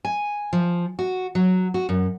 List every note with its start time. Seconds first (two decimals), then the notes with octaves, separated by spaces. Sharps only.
0.05 G#5
0.53 F3
0.99 F#4
1.35 F#3
1.74 F#4
1.89 F#2